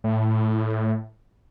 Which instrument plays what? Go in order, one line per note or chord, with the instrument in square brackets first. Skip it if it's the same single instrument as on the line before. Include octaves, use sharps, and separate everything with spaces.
[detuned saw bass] A2